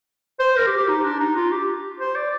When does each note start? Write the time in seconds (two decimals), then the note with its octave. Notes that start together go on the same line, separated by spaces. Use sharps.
0.40 C5
0.56 A#4
0.67 G4
0.77 G4
0.88 D#4
1.04 D4
1.20 D#4
1.36 F4
1.51 G4
2.00 C5
2.16 D5